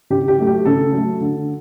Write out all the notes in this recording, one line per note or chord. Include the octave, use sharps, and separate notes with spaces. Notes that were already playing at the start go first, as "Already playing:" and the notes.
C#3 G4
G4
F#3 A3
G4
C#3 A4
F#3 A3
D3